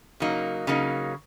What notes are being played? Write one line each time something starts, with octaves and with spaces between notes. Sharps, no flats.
C#3 F#3 A#3 D#4
C#3 F#3 A#3 D#4